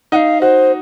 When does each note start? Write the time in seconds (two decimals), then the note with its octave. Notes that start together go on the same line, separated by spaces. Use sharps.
0.12 D#4 F#5
0.16 F5
0.41 F#4 C5